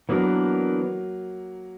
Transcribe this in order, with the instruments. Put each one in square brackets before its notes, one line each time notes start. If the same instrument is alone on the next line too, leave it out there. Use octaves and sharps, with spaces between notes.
[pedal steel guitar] E3 B3 D4 A#4 [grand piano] F#3 A#3